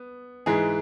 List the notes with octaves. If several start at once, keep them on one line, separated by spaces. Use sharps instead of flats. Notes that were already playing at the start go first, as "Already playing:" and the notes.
Already playing: B3
G#2 E3 G#3 G#4